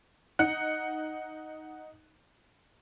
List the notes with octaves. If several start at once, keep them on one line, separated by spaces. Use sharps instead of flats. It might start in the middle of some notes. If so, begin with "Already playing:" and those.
D#4 F#5 F#6 C#7